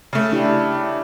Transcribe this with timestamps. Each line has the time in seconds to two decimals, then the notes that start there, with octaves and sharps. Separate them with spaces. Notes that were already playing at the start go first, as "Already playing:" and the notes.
0.13 C#3 A3
0.32 D4 E4 G4